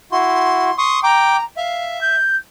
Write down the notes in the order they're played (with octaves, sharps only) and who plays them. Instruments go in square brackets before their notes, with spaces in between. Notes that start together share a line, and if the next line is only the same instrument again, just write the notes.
[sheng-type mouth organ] E4 F#4 [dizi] C6
[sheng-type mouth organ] C6 C#6 D#6
[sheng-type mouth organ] G5 D6 [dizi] A#5
[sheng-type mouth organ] E5 [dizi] F5
[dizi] G6